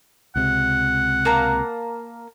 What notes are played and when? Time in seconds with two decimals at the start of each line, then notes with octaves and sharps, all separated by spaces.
0.36 C#2 C3 F#5
1.25 A#3 A5 A#5